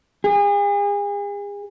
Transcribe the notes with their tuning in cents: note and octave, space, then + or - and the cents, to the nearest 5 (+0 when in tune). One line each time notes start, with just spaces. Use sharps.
G#4 -40